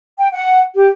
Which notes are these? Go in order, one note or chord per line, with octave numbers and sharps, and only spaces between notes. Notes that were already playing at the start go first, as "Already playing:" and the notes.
G5
F#5
G4